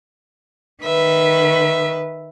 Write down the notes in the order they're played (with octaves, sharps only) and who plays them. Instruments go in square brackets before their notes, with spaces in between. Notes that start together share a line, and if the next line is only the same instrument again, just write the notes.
[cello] D#3 B4 [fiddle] E5